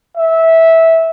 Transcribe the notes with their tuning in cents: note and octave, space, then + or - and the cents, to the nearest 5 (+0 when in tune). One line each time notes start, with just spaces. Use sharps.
E5 -15